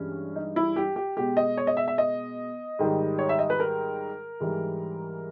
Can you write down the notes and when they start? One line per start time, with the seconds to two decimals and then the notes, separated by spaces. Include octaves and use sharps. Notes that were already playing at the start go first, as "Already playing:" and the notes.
Already playing: G2 E3 G#3 C#4
0.36 D#4
0.56 E4
0.76 G4
0.96 G4
1.17 B2 G#3 G4
1.37 D#5
1.57 C#5
1.67 D#5
1.77 E5
1.88 E5
1.98 D#5
2.79 G#2 D#3 G3
3.19 C#5
3.29 E5
3.39 D#5
3.50 B4
3.60 A#4
4.40 G#2 E3 G3